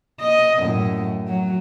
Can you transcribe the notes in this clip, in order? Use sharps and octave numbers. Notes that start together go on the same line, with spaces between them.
D#5
F#2 A2
F#3